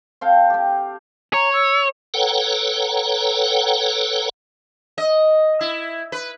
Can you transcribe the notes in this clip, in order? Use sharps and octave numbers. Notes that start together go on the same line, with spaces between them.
C4 A4 F5 G5
C4 G4
C#5 A#5
E6
A4 B4 C#5 F#5 G5 A#5
D#5
E4
B4